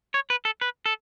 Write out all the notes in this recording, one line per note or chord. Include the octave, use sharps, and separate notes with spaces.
C#5
B4
A4
B4
A4